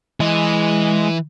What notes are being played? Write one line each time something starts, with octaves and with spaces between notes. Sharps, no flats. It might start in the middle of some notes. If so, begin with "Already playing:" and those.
E3 G#3 D#5